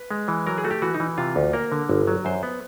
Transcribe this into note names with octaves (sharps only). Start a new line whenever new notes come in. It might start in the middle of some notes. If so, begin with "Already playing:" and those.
Already playing: B4
G#3
E3
F#3 A#4
G#4
A3 F#4
G4
E3 F#4
D#4
E3
C3 F4
D2
A#3 A#4
D3
G1
F#3
F#2 C5
B3